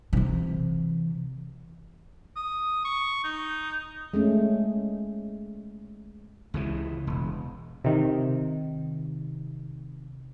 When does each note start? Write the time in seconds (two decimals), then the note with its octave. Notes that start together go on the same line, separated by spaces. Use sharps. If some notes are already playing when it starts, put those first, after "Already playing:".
0.13 C3 E3
2.36 D#6
2.85 C#6
3.24 D#4
4.14 G#3 A3 C#4
6.54 C#2 C#3 E3
7.07 E1
7.85 C3 D#3